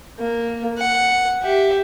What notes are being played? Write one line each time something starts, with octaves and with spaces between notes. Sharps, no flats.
A#3
F#5
G4 E5